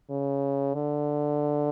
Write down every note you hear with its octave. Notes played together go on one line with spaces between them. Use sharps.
C#3
D3